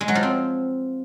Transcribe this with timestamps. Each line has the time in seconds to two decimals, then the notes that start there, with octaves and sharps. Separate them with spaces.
0.01 G#3
0.08 F#3
0.15 F3
0.23 C4